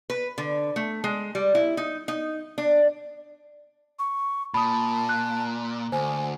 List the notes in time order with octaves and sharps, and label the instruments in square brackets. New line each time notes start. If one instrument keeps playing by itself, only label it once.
[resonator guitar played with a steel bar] B4
D3
A3
G#3
G3
E4
D#4
D#4
D4
[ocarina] C#6
[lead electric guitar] A#2 [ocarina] A5 [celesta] B5 D#6
[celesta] F#6
[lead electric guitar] D2 [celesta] C5 [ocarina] G#5